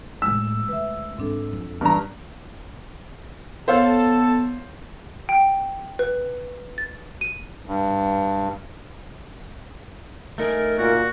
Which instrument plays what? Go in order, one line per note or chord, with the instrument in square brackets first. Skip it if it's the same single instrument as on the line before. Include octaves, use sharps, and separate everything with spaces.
[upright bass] D#2 A2 [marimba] G#3 [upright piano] E6
[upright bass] D2 [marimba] B4 E5
[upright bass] G#2 [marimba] C4 D4 A4
[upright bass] F2
[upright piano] G2 A#5 [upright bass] E3 [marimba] D4
[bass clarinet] B3 [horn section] A4 [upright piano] C5 C#5 F5
[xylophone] G5
B4
A6
D#7
[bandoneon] G2
[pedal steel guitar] A3 D#4 G#4 [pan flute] A#4
[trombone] A#2 [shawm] F#4